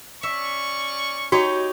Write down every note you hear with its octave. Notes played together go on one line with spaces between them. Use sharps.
C#4 D5 E5 C#6
D#4 F#4 G4 C#5